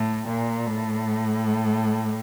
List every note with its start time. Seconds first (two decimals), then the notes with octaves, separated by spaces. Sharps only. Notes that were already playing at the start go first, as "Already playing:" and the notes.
Already playing: A2
0.28 A#2
0.66 A2